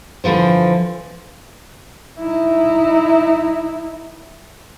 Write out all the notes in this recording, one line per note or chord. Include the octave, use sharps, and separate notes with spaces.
D3 E3 F3 C5
D#4 E4